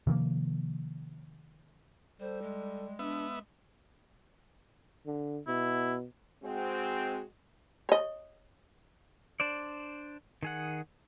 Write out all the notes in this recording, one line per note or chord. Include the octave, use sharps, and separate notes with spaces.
C3 D#3 F3 A#3
G3 A4 C5
G#3
B3 D4 E5
D3
B2 E4
G#3 C4 F#4
C#5 D#5
D4 C5 D5
D#3 G#4 F#5